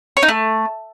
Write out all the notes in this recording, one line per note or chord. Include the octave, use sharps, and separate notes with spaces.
C#5
D#4
A3